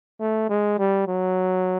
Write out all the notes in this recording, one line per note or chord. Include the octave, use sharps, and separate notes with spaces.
A3
G#3
G3
F#3